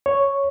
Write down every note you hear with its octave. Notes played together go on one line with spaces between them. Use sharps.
C#5